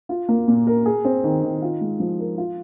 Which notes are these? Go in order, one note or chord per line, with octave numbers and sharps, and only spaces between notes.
F4
A#3
A#2
A#4
G#4
C4
D#3
D#3
F4
G#3
F3
A#4
F4